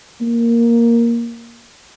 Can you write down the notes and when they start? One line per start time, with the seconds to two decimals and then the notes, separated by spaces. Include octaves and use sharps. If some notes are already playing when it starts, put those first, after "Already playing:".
0.21 A#3